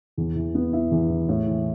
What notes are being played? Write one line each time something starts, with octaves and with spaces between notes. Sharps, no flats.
E2
E3
B3
E4
E2
E3
A2
E3